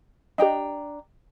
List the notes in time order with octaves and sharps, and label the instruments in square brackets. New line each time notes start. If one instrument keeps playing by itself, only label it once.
[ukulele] D4 G5 A#5 [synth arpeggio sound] G4 D#5